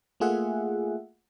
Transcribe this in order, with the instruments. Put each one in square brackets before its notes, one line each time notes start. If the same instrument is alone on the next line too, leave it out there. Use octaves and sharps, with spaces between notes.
[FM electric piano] A3 A#3 F4 G#4 E5 F#5